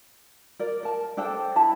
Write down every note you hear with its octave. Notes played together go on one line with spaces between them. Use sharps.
A#4 D5
A#4 A5
D4 A4 C5 G5
E4 A5 B5